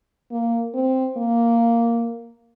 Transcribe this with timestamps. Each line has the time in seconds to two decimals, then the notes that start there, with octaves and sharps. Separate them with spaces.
0.31 A#3
0.75 C4
1.17 A#3